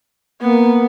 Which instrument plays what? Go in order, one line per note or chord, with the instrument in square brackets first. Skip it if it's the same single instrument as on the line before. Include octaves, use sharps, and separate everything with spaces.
[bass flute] A#3 [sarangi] B3